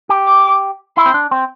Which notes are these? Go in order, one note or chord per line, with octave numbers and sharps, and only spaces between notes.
G4
D6
E4 C6
C4
D4
C4